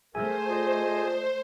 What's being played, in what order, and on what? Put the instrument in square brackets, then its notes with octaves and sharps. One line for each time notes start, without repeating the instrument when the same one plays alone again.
[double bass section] A3 [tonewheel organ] G#4 G#5 [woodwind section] A#4 E5 [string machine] C5
[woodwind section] F4 D5 D#5